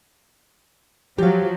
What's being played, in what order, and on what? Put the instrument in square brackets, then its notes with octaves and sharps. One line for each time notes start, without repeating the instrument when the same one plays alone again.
[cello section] F3 F#3 [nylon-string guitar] G4 F5